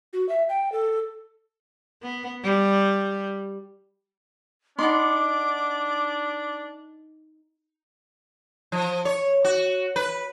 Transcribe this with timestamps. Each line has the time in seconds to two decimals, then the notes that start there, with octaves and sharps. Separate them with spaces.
0.13 F#4
0.29 E5
0.49 G5
0.72 A4
2.03 B3
2.44 G3
4.79 D4 D#4 F#5 B5 C6 D6
8.72 F3
9.05 C#5
9.45 F#4
9.96 B4